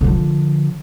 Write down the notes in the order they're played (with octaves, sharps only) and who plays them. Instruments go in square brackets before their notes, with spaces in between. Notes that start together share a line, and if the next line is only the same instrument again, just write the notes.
[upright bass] D3 F3